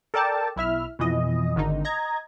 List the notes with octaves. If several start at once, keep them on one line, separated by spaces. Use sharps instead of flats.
A4 A#4 D5 G5 A5
B1 E4 E5 F6
F2 B2 E3 D#5
G#1 D3 D#3 D#4
D#5 A#5 G#6